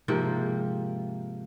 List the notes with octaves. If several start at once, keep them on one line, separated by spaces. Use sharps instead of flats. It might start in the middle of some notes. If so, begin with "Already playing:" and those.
G#2 C3 F3 A#3